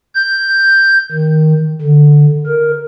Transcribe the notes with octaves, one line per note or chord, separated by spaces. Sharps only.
G6
D#3
D3
A#4